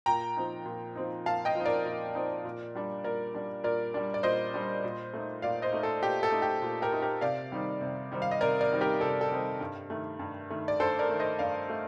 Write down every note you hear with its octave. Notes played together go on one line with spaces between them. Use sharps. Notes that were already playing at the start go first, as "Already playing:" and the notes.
A#2 G5 A#5
F3 C4 D#4
A#2
F3 C4 D#4
A#2 F5 A5
D#5 G5
F3 C4 D#4
A#4 D5
A#2
F3 C4 D#4
A#2
G3 D4
A#2 A#4 D5
G3 D4
A#2 A#4 D5
G3 D4
D5
A#2 C5 D#5
G3 D4
A#2
A3 D#4
A#2 D5 F5
C5 D#5
A3 D#4
A4
A#2 G4
A4
A3 D#4
G4
A#2
G4 A#4
A3 D#4
G4 A#4
C3 D5 F5
D#3 G3 C4 D#4
C3
D#3 G3 C4 D#4
F5
D#5
C3 A#4 D5
A#4 D5
D#3 G3 C4 D#4
G4 A#4
C3 A4
A4
D#3 G3 C4 D#4
G2
D#3 A3
G2
D#3 A3
D5
G2 A4 C5
A#4 D5
D#3 A3
C5 D#5
G2 D5 F5
A3